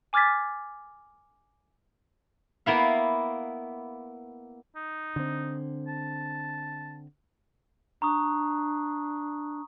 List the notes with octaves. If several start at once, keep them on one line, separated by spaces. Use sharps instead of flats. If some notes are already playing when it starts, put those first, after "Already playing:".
G#5 D6 F6 G#6 A6 B6
A#3 B3 E4 F5
D#4
D3 C4
A5
D4 A#5 C#6 D#6